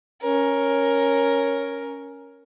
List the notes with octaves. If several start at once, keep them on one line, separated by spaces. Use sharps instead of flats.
C#4 A#4